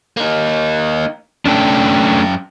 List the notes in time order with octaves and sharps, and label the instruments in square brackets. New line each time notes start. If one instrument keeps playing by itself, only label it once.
[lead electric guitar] A#3 D#4
[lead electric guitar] F#2 G5 [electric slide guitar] A3 C#4 D4